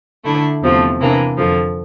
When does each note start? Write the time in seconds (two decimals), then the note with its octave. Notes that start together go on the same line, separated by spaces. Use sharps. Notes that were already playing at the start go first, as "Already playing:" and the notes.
0.24 D3 A3 E4
0.62 E2 C3 F3 A3
1.00 C3 E3 A#3 D4
1.37 F2 D3 F3